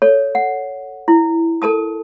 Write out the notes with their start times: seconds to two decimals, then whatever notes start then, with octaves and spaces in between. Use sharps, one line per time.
0.02 A4 C#5
0.35 F#5
1.08 E4
1.62 A4 A#4 A5 D#6